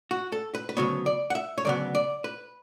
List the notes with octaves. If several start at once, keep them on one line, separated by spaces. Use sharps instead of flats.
F#4
A4
B4
B4
D2 C#3 F#3 B3 C#5
D5
F#5
E5
C#5
D2 C#3 F#3 B3 D5
D5
B4